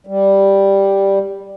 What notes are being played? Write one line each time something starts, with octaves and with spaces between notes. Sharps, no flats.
G3